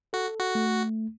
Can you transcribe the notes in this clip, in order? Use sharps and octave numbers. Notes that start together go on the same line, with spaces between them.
F#4 A4
F#4
A3